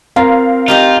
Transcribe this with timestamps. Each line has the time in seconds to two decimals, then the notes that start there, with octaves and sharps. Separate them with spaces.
0.16 C4 F4 A#4 F5 A#5
0.68 D#4 F4 G4 D#5